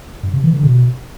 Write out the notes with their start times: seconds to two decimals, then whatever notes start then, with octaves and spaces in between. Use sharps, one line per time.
0.23 G2
0.33 C3
0.43 E3
0.53 D3
0.63 B2